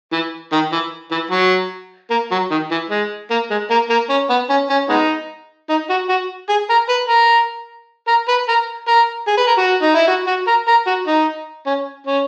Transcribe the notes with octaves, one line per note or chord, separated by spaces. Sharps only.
E3
D#3
E3
E3
F#3
A#3
F#3
D#3
E3
G#3
A#3
G#3
A#3
A#3
C#4
B3
C#4
C#4
G#3 B3 D#4
D#4
F#4
F#4
G#4
A#4
B4
A#4
A#4
B4
A#4
A#4
G#4
B4
A#4
F#4
D#4
E4
F#4
F#4
A#4
A#4
F#4
D#4
C#4
C#4